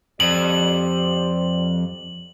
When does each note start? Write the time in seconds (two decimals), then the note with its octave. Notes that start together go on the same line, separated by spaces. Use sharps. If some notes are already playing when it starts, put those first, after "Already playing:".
0.20 F2 G4 C5 D5 F#7